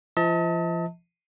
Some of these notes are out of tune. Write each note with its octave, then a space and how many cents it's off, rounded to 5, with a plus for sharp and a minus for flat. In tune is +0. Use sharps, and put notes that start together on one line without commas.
F3 -35 D#5 +45 A5 +20